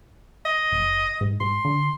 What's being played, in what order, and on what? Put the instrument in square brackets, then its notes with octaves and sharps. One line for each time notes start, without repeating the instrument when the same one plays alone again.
[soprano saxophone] D#5
[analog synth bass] F#1
G#2
[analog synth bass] G#2 [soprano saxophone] C6
[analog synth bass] D3